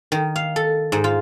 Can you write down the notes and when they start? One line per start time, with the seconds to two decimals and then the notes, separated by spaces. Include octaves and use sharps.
0.12 D#3
0.36 F5
0.56 A4
0.92 G#2
1.04 F4